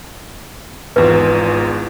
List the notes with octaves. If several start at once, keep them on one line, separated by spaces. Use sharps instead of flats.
G#1 E2 F4 B4